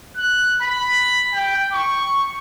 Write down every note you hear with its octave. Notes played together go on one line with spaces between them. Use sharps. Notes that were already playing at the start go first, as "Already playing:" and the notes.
F#6
B5
G5
C#6